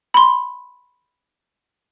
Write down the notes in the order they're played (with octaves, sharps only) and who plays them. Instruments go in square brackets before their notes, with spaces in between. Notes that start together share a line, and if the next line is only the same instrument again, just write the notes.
[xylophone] B5 C6